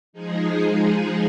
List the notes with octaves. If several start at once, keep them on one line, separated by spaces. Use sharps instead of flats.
F3 G#3 D#4 G#4